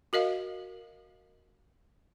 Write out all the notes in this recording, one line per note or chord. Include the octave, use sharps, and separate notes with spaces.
F#4 A#4 D#5 F5